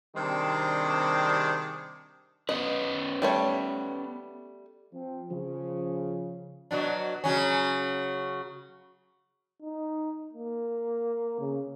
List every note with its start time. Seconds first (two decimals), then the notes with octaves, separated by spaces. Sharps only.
0.15 C3 D#3 G3 C4 D4 G#4
2.49 B3 C#4 B4 D#5
3.22 G3 A3 C#5
4.93 F3 C4
5.31 C#3 F3
6.71 B2 F#3 D4
7.24 C#3 F#3 C#4
9.62 D#4
10.33 A#3
11.40 C#3